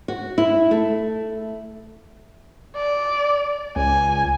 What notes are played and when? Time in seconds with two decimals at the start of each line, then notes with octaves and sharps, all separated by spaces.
0.08 F#4
0.38 E4
0.71 A3
2.76 D5
3.76 C#2 G#5